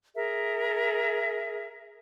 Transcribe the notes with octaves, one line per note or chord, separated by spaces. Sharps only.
G#4 A#4 E5